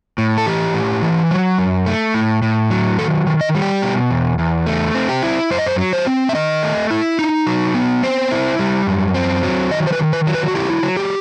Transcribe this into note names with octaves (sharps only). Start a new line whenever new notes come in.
A2
A4
E3 G4
A2
E3
F#3
F#2
A3
A2
A2
F#3
D#3 A4
D#3
D#5
G3
G4
B2
E2
E2
A3
C4
G4
E4
F#2 C5
D#5
C5
F#3
C5
C4
E5
D#3 D#5
A3
E4
D#4
F#3
B3
C4 C5
E4
G3
F#2
C4
F#3
D#3 D#5
C5
B4
D#3
B4
F#3
B4
F#4
E4 G4
F#3
G4